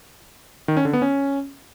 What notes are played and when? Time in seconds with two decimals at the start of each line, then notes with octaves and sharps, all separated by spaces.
0.68 D#3
0.77 C#4
0.85 D3
0.93 B3
1.02 C#4